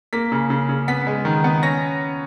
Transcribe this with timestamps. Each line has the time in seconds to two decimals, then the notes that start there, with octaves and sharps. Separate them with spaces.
0.13 A#3 B6
0.32 C#3
0.50 C#3
0.69 C#3
0.88 B3 B6
1.07 G#3
1.25 D#3
1.44 B3
1.63 C#4 A#6